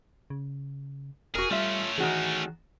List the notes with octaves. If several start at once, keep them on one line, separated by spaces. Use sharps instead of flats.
C#3
E1 F#4 G#4 A#4
G3 A3 C#4 F4 E5
D#3 E3 F#4 G#4